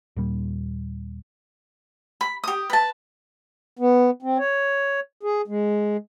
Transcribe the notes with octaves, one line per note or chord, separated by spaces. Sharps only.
D#2 A#2 G3
B5
G4 D#6
B4 A5
B3
C4
C#5
G#4
G#3